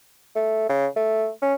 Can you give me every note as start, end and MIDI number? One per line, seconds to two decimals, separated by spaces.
0.35 0.67 57
0.69 0.87 49
0.96 1.29 57
1.42 1.54 61